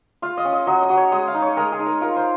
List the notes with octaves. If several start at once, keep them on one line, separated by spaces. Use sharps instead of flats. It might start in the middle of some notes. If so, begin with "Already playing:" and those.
F4 F5
D#5
C#4
D#5
F#3 D#5
D#5
F#3
C#5
G#3 D#5
F5
D#4
C#5
G#3 A#4
G#4
D#4
A#4
F4 A#4
C5